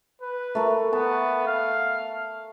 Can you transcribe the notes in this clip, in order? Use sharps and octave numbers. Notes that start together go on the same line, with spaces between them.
B4
A3 A4 A#4
B3 A5
F5